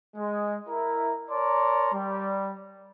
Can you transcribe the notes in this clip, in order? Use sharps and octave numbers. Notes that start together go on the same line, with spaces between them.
G#3
E4 A#4
A#4 C#5 D5 A5 A#5 C6
G3